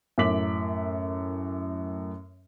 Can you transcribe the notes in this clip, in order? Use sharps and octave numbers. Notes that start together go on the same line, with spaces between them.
F#2 A2 A#4 D6 B6 F#7